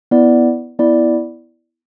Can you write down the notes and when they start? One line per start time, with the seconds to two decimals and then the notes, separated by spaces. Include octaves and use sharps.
0.11 B3 E4 D5
0.79 B3 E4 D5